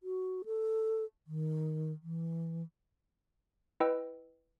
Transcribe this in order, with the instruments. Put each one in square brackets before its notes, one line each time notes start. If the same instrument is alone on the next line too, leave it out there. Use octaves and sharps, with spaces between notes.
[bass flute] F#4
A4
D#3
E3
[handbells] E4 B4 D#5 G5 E6